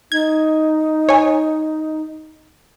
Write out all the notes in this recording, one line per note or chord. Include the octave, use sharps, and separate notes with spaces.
D#4 G#6
C#5 G#5